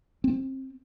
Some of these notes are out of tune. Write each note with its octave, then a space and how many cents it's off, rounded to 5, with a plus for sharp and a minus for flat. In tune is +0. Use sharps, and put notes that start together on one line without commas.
C4 +25